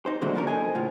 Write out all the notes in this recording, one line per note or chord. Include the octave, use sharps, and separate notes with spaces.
D#4 C5
D2 A#2 D3 F#3 G#3 E4
B2 F3 C#4 D4 A#4
A4 C5 D#5 G#5
A2 C#3 F4